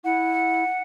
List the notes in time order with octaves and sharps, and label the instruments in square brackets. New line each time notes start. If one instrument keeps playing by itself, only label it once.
[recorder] E4 [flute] F#5